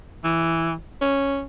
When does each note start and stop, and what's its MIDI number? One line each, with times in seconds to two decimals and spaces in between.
0.24 0.74 52
1.02 1.44 61